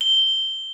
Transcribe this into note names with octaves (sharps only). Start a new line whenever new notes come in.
G7